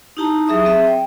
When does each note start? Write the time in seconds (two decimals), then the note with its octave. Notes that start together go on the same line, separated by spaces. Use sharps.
0.17 D#4 E4 G4 A5 A#5
0.47 F#3 G#4 E5 C#6 D#6
0.65 C4 G#4 E5
0.87 G5